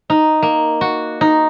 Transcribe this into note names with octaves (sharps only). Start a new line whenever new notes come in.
D#4
A#3
F#4
D#4